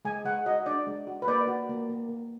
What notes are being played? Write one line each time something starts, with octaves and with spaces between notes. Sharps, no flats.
G#3 G#5
G#3 F#5
F#4 D#5
D4 D5
G#3
F#4
B4
A#3 D5
F#4
A#3
A#3
A#3